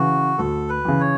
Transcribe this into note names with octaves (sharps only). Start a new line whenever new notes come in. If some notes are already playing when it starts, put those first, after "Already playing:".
Already playing: C#3 E3 F#4
D2 A4
B4
C#3 E3
C#5